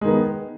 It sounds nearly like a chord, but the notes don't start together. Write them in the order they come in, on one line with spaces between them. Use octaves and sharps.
G#3 D#3 B3